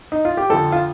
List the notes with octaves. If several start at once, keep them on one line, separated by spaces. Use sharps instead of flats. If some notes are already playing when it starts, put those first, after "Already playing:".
D#4
F4
G4
F2 D3 F3 A4
F4